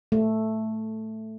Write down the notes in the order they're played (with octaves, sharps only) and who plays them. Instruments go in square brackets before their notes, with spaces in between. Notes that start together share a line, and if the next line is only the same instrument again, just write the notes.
[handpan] A3